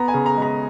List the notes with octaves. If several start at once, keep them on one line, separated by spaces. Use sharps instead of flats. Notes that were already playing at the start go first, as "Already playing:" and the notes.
Already playing: B3 A#5
G#5
C#3
A#5
G#3
A#5